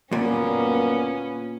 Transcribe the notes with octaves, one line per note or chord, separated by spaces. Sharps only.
F#1 D2 A#2 G3 A#3 B3 C#4